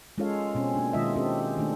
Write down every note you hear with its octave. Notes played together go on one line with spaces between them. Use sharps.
G#3 C#4 F4 A4 C#5 F5
B2 C4 C#4
A#3 D4
B2 D#3 G#3 F4 D#5 E5
C4 C#4 G4 A4
D#3 A3 D4